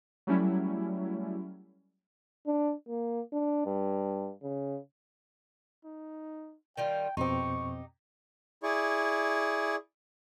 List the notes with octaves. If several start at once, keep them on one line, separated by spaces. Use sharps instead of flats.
F#3 G3 A3 C#4 E4
D4
A#3
D4
G2
C#3
D#4
D#3 G3 F4 G5
F2 B2 C4 D#4 G4 C#6
E4 G#4 D5 C#6